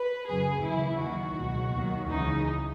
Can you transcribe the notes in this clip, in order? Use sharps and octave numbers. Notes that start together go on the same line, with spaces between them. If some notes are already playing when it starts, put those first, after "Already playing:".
Already playing: B4
F#2 C#3 F#3 G#4
D#2 C#3 E3 E4
D#2 D#3 F#3 F#4
C#2 B2 F#3
D#2 D#3 F#3
C#2 C#3 E3 D#4